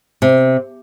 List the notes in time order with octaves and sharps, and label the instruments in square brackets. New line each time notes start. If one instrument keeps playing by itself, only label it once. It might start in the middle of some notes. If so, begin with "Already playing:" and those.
[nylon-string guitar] C3